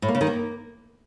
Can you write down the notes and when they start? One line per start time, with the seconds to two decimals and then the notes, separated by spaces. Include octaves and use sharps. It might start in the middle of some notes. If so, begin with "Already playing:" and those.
0.02 A2
0.08 A#3
0.15 C#3
0.21 D#3
0.27 A#3